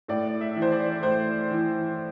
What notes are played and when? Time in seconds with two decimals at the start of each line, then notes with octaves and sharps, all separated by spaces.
0.08 A2 D5
0.41 E5
0.56 E3
0.62 C5
0.72 D5
1.03 A2 C5
1.51 E3